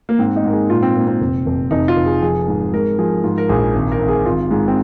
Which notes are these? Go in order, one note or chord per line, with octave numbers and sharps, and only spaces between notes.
A#3
G#2 C4
D#4
G#2 A#4
G#4
A#2 F4
C4
A#2 A#3
C4
F1
F1
F1 D#4
F4
F1
G#4
F3 G#4
G#2
G#3 A#4
F3 G#4
G#2 F4
A#4
A#1 G#4
G#1
A#4
G#1
G#4
G#1 F4
G#2 G#4
C4